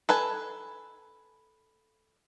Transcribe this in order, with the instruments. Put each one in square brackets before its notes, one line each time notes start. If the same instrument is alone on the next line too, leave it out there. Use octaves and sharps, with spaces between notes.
[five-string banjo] A4 B4 G#5